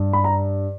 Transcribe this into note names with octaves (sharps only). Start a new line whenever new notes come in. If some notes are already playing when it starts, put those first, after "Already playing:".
Already playing: G2
B5
A#5